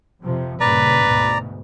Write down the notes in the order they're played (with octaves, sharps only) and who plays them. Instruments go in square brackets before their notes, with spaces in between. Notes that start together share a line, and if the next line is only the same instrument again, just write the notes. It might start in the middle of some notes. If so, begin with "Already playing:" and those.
[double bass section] F2 C3 F3
[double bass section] G2 A#2 C#3 [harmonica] B4 [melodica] D5 A#5
[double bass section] D2 G#2 B2